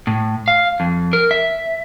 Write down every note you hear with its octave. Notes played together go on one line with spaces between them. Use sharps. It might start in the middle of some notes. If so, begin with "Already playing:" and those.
A2
F5
F2
A#4
E5